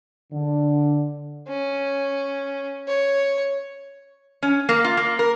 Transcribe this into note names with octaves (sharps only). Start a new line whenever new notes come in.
D3
C#4
C#5
C#4
A#3
F4
A#3
A#4